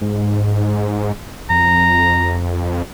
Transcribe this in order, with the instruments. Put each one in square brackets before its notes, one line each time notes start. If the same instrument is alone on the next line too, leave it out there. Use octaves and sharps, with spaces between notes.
[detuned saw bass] G#2
[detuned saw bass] F2 [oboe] A#5